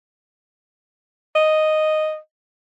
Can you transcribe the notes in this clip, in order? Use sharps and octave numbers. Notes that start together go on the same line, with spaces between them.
D#5